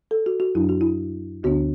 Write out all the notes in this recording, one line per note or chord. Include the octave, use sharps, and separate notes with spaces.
A4
F#4
F#4
F#2 F#3 D4 E4
F#4
E4
D2 D3 B3 D4 F#4